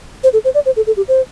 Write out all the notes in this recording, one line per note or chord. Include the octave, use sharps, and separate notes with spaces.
C5
A4
C5
D5
C5
A4
A4
G4
C5